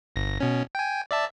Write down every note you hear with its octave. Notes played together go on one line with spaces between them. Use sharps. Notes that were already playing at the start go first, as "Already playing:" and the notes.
G1 A#6
B2 C#4
G5 G#5
D5 E5 A5